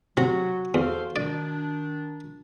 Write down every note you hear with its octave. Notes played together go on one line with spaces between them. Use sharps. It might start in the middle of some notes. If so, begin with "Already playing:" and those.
C3 F#3 F#4
E2 A4 C5 F5
D#3 D4 D5